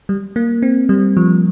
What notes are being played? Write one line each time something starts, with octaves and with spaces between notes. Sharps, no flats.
G3
A#3
C4
G3
F3